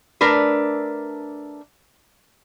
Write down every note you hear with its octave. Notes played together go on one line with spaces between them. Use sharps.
A3 D4 A#4 B4